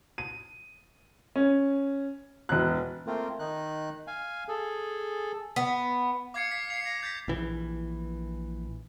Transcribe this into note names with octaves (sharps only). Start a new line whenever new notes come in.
D#7
C#4
E1 F#6
A3 A#3 C4 F4
D#3 D#4 F#6
F5 G#5
G#4 A4
B3
F5 D6 G#6 C#7
B6
C7 F7
A#6
G6 A6 B6
A#1 E3